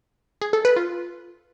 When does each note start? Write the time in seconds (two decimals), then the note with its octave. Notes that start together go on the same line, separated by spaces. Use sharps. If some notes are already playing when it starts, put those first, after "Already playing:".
0.41 G#4
0.53 A4
0.65 B4
0.76 F4